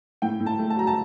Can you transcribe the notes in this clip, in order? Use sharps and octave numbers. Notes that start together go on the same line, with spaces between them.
A2 G5
A2
A5
A3
A5
F#3 A#5
A5